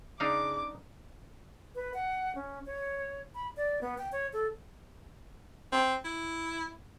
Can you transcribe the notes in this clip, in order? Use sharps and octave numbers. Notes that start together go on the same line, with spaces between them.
C#3 D4 D#4 F5 D6
B4
F#5
C#4
C#5
B5
D5
B3
G5
C#5
A4
C4
E4